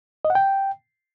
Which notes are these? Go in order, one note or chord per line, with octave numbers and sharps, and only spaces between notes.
D#5
F#5
G5